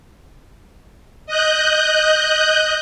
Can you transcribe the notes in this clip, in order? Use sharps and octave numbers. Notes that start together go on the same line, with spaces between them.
D#5 F#6 G6